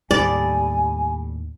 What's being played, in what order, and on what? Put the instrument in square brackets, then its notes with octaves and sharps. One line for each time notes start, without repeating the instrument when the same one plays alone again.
[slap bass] D#2 A2 [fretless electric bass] G3 [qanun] D5 [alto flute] G#5